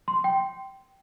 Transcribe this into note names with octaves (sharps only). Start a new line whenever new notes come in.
C6
G5